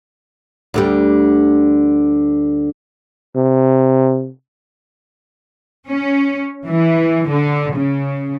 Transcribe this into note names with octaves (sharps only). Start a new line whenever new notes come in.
D2 D3 G3
C3
C#4
E3
D3
C#3